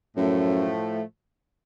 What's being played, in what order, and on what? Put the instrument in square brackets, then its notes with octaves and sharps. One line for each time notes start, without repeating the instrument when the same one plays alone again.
[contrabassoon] F#2 [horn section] A2 F3 A3